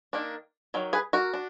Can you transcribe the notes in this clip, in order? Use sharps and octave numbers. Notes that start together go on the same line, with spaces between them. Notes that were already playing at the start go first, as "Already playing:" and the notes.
D#3 A#3 D4
D#3 F#3
G#4 B4
F#4 A#4
D4